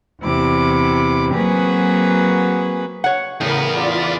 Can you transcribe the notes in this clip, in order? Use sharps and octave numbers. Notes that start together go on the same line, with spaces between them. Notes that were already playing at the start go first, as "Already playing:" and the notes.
E2 C3 E4 D6
F#3 A#3 C4 F#4 G#4 B4
C#5 F#5
E2 A2 C#3 B3 A#4
F4 D5